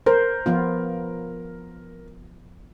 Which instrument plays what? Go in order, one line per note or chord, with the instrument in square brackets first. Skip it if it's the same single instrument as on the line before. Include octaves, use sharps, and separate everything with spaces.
[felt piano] A#4 [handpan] C5
[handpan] F3 B3 F4